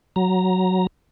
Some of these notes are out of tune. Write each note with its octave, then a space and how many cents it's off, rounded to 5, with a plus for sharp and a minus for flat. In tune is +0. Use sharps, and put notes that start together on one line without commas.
F#3 +0 A#5 +5